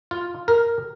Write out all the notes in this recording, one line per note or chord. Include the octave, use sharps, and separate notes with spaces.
F4
A#4